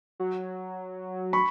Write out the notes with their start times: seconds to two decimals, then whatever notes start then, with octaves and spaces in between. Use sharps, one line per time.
0.20 F#3
1.33 B5 C#6